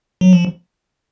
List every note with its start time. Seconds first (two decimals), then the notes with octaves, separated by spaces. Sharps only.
0.21 F#3
0.33 F3